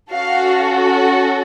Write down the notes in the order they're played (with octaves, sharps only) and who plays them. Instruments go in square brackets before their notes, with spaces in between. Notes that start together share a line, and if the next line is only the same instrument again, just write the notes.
[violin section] C#4 F#4 A4 F5